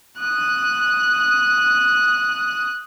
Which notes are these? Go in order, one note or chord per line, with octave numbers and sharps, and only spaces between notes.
D#6 F#6